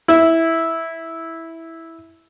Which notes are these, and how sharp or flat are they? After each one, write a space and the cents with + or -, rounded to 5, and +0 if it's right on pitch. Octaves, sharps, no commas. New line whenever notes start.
E4 -5